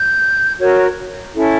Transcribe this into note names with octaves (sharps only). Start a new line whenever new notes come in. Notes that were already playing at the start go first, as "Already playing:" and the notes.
Already playing: G6
F#4 A#4 C#5
C#4 E4 A4